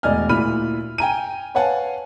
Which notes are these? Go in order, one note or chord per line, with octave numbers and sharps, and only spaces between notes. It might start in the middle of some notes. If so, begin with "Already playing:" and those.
E1 A2 D5 D#5 G#5 F6
D2 A#2 E4 B5 F6 D#7
G5 G#5 A#5 D#7
B4 C#5 F5 F#5 G#5 A5